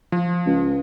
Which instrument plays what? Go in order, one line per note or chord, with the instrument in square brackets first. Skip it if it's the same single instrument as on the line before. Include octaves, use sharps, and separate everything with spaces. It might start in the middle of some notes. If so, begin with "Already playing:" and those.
[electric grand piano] F3
[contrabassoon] C#2